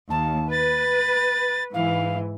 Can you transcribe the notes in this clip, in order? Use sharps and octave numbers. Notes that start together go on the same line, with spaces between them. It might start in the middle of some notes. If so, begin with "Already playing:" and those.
D#2 A5
B4 A6
G#2 E3 F5